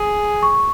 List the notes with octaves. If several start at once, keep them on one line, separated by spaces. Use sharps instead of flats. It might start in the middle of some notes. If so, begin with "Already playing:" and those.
Already playing: G#4
C#6